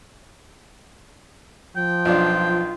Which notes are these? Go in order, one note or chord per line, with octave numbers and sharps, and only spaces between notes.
F3 G5
B1 D4 F4